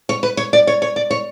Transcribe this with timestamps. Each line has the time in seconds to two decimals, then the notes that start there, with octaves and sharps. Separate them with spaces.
0.09 C#5
0.23 B4
0.37 C#5
0.53 D5
0.67 C#5
0.82 C#5
0.96 D5
1.10 C#5